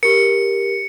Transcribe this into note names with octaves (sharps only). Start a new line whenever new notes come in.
G4 A#4 C#7